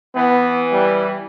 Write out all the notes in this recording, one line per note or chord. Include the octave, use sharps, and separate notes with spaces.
E3 B3
G3